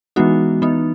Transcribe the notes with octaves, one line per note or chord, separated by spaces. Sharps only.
E3 G#3 B3 D#4 F#4
E3 B3 D#4